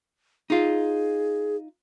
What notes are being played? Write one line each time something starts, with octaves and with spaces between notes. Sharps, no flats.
D#4 F4 G#4